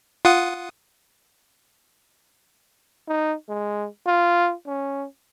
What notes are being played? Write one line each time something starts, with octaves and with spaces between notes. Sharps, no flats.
F4 F#5 D#6
D#4
G#3
F4
C#4